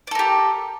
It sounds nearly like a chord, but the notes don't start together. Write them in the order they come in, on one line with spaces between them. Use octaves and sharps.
D5 A4 A#4 G4